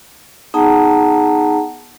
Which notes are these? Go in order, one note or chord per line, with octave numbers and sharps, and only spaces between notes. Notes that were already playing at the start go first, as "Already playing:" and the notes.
B3 D#4 G#4 F#5 A5 A#5